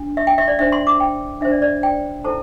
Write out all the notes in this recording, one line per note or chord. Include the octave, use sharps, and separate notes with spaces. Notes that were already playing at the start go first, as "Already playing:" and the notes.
Already playing: D4
E5
G5
E5
D5
D4 C5 E5
C6
D6
G5
D4 C5 E5
D5
D5
G5
E4 A4 C5 A5